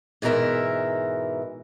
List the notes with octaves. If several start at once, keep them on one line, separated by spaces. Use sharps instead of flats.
G#2 B2 E3 A#4 E5